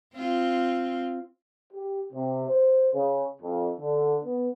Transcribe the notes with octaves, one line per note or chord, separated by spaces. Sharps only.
C4 F4
G4
C3
C5
C#3
F2
D3
B3